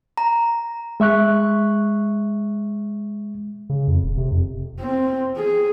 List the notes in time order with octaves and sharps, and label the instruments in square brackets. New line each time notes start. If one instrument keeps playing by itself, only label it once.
[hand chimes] A#5
[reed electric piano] G#3 E5 C#6 F#6
[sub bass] C#3
F2
E1
C3
F2
[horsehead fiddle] C4
G#4